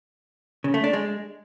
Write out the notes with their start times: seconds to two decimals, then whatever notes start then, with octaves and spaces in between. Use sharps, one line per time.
0.64 C#3
0.74 A3
0.84 D4
0.93 G#3